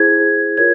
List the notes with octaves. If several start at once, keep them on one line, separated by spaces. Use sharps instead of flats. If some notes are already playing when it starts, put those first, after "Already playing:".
Already playing: E4 G#4 C5 G#6
F4 A#4 C#5 G#6